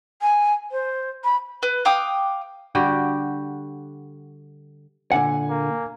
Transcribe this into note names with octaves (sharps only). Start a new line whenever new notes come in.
G#5
C5
B5
B4
F5 G5 D6 D#6
D3 G3 F#4 G4
A#2 D3 F#5 G#5
A#3